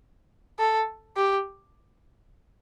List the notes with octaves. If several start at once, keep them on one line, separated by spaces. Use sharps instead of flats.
A4
G4